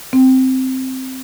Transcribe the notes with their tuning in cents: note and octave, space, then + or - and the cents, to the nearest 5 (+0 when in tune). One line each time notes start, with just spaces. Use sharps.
C4 -5